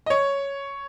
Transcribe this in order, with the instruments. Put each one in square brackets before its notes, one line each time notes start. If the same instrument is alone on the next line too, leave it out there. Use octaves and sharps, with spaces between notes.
[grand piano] D#5
C#5